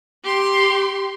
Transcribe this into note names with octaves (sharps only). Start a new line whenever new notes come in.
G4 C6